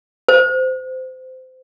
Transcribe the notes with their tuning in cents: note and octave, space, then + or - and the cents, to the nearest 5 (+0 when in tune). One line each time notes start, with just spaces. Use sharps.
C5 -20